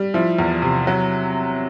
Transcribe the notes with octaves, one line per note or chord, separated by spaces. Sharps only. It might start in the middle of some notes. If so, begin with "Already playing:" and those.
Already playing: G3
F3 E4
E2
C3
F#3